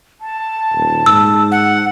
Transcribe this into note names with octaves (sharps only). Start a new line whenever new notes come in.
A5
D#1
G#2 E6
F#5